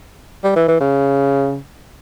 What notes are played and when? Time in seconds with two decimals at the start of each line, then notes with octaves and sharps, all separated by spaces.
0.44 G3
0.56 E3
0.68 E3
0.80 C#3